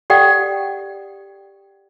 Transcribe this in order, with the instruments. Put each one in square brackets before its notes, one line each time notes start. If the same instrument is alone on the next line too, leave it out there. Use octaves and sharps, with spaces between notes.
[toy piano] G4 A4 D5 F#5 G5